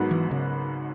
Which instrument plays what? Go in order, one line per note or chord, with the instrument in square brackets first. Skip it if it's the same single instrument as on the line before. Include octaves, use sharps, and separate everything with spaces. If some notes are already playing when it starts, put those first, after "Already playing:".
Already playing: [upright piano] G#1 G#2 F#3 B3 F#4
[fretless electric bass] E3
C#3